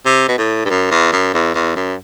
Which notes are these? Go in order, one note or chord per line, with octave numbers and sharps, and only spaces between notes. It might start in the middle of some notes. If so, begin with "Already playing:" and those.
C3
B2
A2
G2
F#2
E2
F#2
E2
E2
F#2